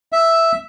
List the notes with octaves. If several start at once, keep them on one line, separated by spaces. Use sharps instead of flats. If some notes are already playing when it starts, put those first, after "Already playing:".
E5